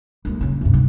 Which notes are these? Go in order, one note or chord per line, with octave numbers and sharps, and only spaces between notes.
D#2 G#3
C#3 C#4
G2 C3
D#3